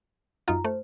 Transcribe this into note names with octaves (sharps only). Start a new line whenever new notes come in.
F#2 D#4 F4 A#5
A3 C5